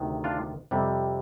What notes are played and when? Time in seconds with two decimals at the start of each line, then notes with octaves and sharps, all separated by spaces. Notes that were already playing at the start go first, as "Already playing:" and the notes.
Already playing: D2 C3 D#3
0.24 D4 F4
0.71 F2 C3 G3 C4